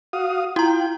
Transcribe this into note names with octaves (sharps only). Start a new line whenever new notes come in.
F#4 F5 D#6
E4 F4 G5 A#5